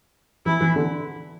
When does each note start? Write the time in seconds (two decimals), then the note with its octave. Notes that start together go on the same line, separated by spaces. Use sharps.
0.46 E3 E4
0.61 E3
0.76 D3